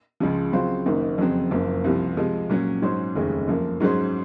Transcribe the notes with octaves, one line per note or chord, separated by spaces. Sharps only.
C#2 C#3 F3
C#3 F#3 C4 F4 C5
F#1 F#2 D#3 A#3 D#4
F2 C#3 F#3 C4
F#1 F#2 F3 A#3
C2 C3 F3
C3 F3 G#3
A#2 F#3 C#4
G#2 F#3 C#4 G#4 C5
F1 D#2 C#3 G#3
F#2 F3 A#3
G#2 F#3 C#4 G#4 C5